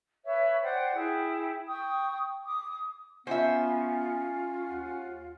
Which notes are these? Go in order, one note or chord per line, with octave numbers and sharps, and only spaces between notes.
B4 C#5 E5
C5 D5 F#5 G5
E4 G#4 G5
G5 C#6 D#6
D6 D#6
B3 C#4 F4 C5 E5
D#2 F#5